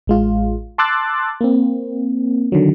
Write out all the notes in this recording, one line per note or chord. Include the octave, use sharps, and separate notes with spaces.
A1 G#3 F4
A5 C6 D6 E6 F#6 A6
A#3 C4
D3 D#3 F#3